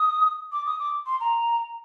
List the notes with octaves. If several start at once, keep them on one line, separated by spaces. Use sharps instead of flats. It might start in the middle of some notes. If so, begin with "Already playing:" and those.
Already playing: D#6
D6
D#6
D6
C6
A#5